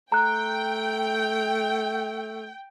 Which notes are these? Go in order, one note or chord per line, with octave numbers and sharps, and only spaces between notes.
A3 G5 A#5 F#6